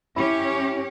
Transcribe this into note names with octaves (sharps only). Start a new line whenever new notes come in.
C#4 E4 G4 C#5